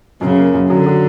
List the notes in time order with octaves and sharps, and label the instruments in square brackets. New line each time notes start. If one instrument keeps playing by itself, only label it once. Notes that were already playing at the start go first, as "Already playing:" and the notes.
[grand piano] F#2 [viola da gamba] C#3
[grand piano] A#3
F#2
[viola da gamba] D3 [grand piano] F#3
[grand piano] F#3